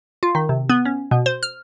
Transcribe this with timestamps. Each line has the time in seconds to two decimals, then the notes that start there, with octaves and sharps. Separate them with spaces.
0.23 F4
0.35 D#3
0.49 C3
0.69 B3
0.85 C#4
1.11 B2
1.26 C5
1.43 F6